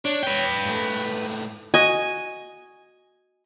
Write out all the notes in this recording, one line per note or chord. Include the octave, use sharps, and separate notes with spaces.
D4 C#5
B4 G5
G#2 A3
F#4 D#5 G#5